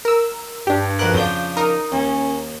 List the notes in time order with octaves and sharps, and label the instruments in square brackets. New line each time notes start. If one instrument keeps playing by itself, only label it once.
[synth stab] A#4 E6
[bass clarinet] G2 [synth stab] D4 G4
[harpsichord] F2 B2 A#4 [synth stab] F#6
[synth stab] F2 G6 [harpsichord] C#3 F3 D4
[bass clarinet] D#4 [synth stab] A#4 D#6
[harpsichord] D#2 [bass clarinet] C#4